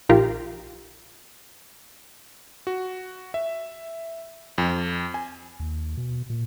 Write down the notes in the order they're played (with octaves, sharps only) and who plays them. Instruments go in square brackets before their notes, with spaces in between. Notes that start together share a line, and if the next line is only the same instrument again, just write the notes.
[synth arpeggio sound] A#1 D#4 F4 G4 A#4
[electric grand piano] F#4
E5
F2
G#5
[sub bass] D#2
B2
A#2